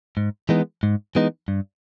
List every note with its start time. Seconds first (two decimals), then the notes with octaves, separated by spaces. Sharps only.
0.17 G#2
0.49 E3 G#3 B3 D#4
0.83 G#2
1.15 E3 G#3 B3 D#4
1.48 G2